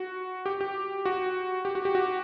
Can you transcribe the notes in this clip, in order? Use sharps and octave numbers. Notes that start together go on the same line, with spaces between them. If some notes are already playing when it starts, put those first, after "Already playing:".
Already playing: F#4
G4
G4
F#4
G4
F#4
G4
F#4